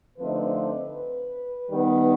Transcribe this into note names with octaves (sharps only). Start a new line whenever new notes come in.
D3 F3 A3 C4 D#4 B4
D#3 G3 B3 D#4